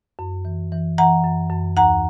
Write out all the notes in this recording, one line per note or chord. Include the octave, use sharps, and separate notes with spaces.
F#2
E3
E3
E3 F#5 A#5
F#2
F#2
D#2 F#5 A#5